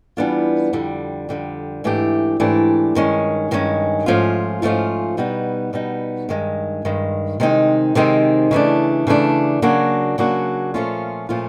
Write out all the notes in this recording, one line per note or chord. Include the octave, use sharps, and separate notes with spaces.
E3 G3 B3 D4 F4
F2 D3 G3
F2 D3 G3
G#2 E3 A3 D4 G4
G#2 E3 A3 D4 G4
G2 D#3 G#3 C#4
G2 D#3 G#3 C#4
G#2 F3 A3 C#4 F4
G#2 F3 A3 C#4 F4
B2 G3 B3 D#4
B2 G3 B3 D#4
G2 D#3 G#3
G2 D#3 G#3
C3 D#3 G#3 C4 D#4
C3 D#3 G#3 C4 D#4
C#3 E3 A3 D4
C#3 E3 A3 D4
C#3 F#3 A#3 D4 F#4
C#3 F#3 A#3 D4 F#4
A#2 F3 A3 C#4 F4
A#2 F3 A3 C#4 F4